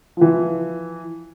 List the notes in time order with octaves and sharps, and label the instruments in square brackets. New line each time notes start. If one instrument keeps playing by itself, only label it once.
[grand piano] E3 F3